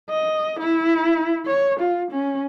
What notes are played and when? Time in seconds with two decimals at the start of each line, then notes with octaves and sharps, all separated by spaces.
0.10 D#5
0.59 E4
1.45 C#5
1.80 F4
2.11 C#4